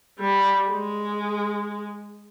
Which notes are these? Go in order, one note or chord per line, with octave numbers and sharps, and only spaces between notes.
G3
G#3